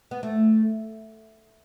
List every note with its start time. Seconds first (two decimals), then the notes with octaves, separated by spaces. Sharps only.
0.11 B3
0.23 A3